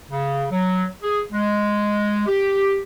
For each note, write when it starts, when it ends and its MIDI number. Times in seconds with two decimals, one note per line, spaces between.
0.11 0.45 49
0.52 0.84 54
1.02 1.20 68
1.32 2.26 56
2.27 2.79 67